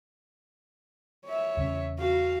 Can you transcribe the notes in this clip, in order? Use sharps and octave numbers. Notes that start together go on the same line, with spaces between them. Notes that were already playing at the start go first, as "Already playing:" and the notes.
C#5 E5
E2 C#3 C#4
F#4 F5